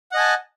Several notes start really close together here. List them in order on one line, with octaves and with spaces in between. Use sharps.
F#5 D#5 G#5 A5